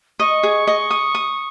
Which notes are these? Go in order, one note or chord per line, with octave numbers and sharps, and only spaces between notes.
D#5 C#6
G#4
D#5
D#6
D#6